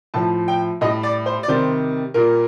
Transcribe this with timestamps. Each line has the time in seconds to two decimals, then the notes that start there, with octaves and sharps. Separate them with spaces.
0.14 A2 F3 A5
0.48 G5
0.81 A2 D#5
0.84 G3
1.03 D5
1.26 C5
1.43 D5
1.48 C3 D#3 G3 C5
2.14 A#2 G3 A#4